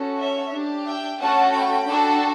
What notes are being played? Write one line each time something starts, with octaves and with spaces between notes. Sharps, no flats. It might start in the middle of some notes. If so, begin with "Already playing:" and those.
Already playing: C#4 F#4 A4
C#5 E5
D4 G4
E5 G5
A3 C#4 F#4 A4 F#5 A5
G5 B5
D4 F#4 A4